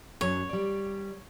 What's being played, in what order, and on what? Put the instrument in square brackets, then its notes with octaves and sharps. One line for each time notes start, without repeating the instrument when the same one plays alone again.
[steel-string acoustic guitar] F#2 F#3 [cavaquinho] C#5
[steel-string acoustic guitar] G3 D5